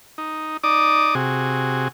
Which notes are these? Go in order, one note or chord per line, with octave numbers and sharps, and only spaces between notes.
D#4
D#4 D5 D6 D#6
C3 F#4 G#4